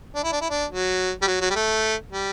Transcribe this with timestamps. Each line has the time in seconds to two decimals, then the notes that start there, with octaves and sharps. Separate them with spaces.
0.15 D4
0.24 E4
0.32 D4
0.41 E4
0.50 D4
0.72 F#3
1.22 G3
1.27 F#3
1.41 F#3
1.50 G3
1.55 A3
2.12 G3